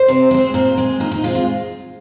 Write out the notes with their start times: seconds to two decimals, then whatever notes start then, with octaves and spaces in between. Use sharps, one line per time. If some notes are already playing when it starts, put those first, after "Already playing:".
Already playing: C5
0.08 C3
0.31 G#3 C4
0.54 A#2 C4
0.77 G#3 C4
1.00 A#2 D#4
1.12 D#4
1.24 G#3 F4
1.28 C4
1.35 F4